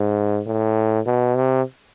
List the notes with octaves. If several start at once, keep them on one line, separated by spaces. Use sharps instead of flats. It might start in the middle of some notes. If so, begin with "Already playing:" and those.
Already playing: G#2
A2
B2
C3